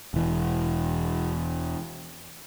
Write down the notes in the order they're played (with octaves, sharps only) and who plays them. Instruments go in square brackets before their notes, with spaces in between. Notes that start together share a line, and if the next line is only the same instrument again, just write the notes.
[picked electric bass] E1 E3